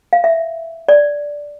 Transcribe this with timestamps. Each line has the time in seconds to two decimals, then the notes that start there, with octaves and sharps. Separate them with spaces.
0.13 F5
0.24 E5
0.88 D5